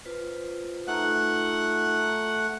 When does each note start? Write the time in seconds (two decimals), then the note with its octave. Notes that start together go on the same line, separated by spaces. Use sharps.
0.05 F4 B4 C5
0.88 A3 D#4 F4 F#5 A#5 F#6